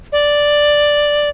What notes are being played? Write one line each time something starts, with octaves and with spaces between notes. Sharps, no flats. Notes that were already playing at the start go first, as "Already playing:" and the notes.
D5